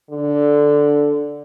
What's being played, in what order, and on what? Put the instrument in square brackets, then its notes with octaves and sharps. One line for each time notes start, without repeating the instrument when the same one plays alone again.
[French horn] D3